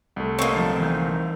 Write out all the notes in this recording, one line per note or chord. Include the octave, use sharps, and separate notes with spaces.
C2 A3
A#3 C4 C#5 D#5
D3 F3
E3 D#4